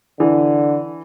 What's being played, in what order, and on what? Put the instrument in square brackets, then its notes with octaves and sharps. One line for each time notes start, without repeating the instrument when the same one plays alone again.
[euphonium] D3 [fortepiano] E3